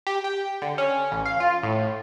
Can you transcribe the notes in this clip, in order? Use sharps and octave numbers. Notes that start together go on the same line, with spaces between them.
G4
G5
D3
C#4
A1
F5
F4
A2